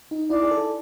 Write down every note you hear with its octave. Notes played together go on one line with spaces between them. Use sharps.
D#4
E4 D5
G#4
A4